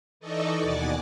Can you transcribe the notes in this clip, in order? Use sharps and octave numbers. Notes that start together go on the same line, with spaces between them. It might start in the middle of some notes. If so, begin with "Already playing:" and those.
E3 D#4 A4 D5 D#5 C#6
D#2 B2 D5 F#5 G#5 D6